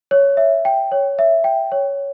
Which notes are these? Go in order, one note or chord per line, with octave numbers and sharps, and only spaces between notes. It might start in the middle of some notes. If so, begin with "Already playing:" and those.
C#5
E5
G5
C#5
E5
G5
C#5